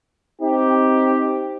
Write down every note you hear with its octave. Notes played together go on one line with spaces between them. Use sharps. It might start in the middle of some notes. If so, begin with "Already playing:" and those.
C4 D#4 G4